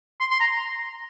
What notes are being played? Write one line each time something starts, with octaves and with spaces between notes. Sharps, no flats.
C6
C6
A#5